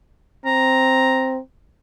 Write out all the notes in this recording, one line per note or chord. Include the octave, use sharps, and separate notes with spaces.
C4 A#5